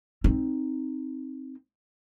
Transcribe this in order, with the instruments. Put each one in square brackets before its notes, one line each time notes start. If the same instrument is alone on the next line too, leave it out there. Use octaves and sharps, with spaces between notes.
[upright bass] C4 D#4